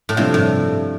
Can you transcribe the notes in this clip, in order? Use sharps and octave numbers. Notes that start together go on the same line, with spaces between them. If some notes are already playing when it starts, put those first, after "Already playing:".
A2
G2 C3 F3 D4 F4
A2